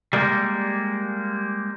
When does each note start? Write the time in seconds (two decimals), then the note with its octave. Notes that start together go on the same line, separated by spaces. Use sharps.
0.13 G3 G#3 A#3